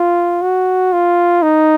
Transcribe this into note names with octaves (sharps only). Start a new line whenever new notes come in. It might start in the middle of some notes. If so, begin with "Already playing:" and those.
Already playing: F4
F#4
F4
D#4